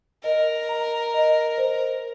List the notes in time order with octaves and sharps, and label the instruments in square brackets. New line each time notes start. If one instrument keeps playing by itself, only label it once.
[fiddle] A#4 [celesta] D#5
[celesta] A#5
D#5
C5